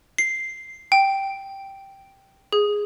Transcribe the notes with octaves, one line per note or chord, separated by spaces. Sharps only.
C7
G5
G#4